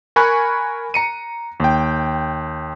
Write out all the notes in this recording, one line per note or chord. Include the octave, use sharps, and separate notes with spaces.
A#4 G#5 B5 C#6 F#6
A#5 C#7 D#7
D#2 G5